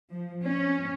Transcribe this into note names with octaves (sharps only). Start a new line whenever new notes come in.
F3
C#4